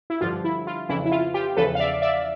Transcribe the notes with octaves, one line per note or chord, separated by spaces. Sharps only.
E4
G2 D3 F3 F4
E4
F4
F2 C#3 E3 E4
E4
F4
F4 G4
E2 C#3 F3 A4 B4
F5
D5 E5
D5 E5